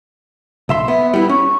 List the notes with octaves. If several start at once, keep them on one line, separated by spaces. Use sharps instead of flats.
B1 E5 C6
B3 E5
G3 B3 E4
C#4 C#6